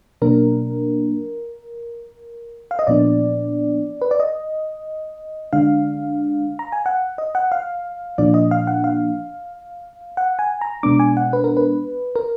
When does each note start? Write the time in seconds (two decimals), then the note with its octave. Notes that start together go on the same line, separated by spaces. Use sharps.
0.22 B2 F#3 A#3 D4 A#4
2.71 F5
2.79 D#5
2.87 A#2 F3 B3 D4 D5
4.02 B4
4.11 D5
4.20 D#5
5.53 D3 G#3 D4 F5
6.59 A#5
6.72 G#5
6.86 F#5
7.18 D#5
7.35 F#5
7.52 F5
8.18 A#2 F3 A#3 D4 D5
8.34 D#5
8.51 F5
8.67 F#5
8.84 F5
10.17 F#5
10.39 G#5
10.61 A#5
10.83 B2 G#3 B3 D4 D6
11.00 G#5
11.17 F#5
11.33 B4
11.44 A#4
11.57 B4
12.16 A#4